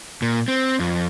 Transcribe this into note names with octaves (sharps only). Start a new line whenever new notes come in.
A#2
C4
F2